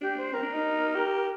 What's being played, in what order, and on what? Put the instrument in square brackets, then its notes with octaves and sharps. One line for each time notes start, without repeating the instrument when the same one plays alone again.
[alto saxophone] D4 [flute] G4
[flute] C5
[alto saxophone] C4 [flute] A#4
[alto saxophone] D4
D#4
G4